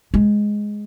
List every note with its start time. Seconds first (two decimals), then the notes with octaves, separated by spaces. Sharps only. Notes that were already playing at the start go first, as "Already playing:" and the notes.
0.14 G#3